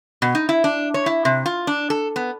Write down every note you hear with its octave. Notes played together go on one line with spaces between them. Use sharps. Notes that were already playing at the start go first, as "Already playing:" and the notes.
B2
D#4
E4
D4
C#5
E4
C3
F4
D4
A4
B3